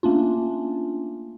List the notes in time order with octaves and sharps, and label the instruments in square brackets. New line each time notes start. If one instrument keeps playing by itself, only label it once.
[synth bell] A3 A#3 C#4 D4 F4